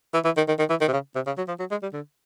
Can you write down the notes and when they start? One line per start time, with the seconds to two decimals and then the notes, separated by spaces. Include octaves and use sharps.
0.14 E3
0.25 E3
0.37 D#3
0.48 D#3
0.59 D#3
0.70 E3
0.81 D#3
0.88 C3
0.93 C#3
1.15 C3
1.27 C#3
1.37 F#3
1.48 F3
1.59 F#3
1.71 G#3
1.83 G3
1.93 D3